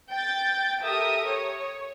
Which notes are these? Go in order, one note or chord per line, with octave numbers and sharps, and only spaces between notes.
G5 G6 A6
G4 A4 A#4 E5 D#6
C#5